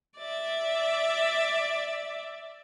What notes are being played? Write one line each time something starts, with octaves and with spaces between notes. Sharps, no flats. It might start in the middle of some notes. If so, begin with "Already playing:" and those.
D5 E5